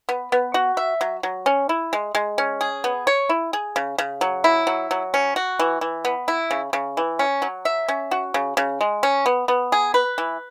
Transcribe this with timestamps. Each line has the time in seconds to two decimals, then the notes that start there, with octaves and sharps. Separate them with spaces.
0.09 B3
0.32 B3
0.54 F#4
0.77 E5
1.01 F#3
1.23 F#3
1.46 C#4
1.69 E4
1.93 G#3
2.15 G#3
2.38 C#4
2.61 G#4
2.84 B3
3.07 C#5
3.29 E4
3.53 G#4
3.76 C#3
3.98 C#3
4.21 F#3
4.44 E4
4.67 F#3
4.91 F#3
5.14 C#4
5.36 F#4
5.59 E3
5.81 E3
6.05 B3
6.28 E4
6.51 C#3
6.73 C#3
6.97 E3
7.19 C#4
7.42 F#3
7.65 E5
7.88 C#4
8.11 F#4
8.34 C#3
8.57 C#3
8.81 G#3
9.03 C#4
9.26 B3
9.48 B3
9.72 G#4
9.94 B4
10.18 E3